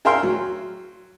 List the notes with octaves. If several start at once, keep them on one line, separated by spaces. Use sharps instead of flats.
G#4 A#4 E5 F5 G5 C6
F#3